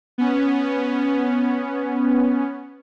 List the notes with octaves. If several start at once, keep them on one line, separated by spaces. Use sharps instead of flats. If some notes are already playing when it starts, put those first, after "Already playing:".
B3 C#4